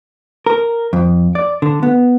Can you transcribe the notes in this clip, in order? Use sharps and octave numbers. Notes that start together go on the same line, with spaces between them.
A#4
F2
D5
D3
B3